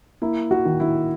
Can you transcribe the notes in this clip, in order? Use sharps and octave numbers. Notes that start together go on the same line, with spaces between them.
A#3 E4
F#4
D#3
E4